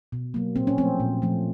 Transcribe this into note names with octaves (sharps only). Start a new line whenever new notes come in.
B2
F#3 A#3
A#2 C4
C#4
F3 A3 C4
A#2
F3 A3